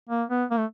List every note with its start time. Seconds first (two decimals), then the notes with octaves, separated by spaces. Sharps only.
0.09 A#3
0.30 B3
0.51 A#3
0.58 A3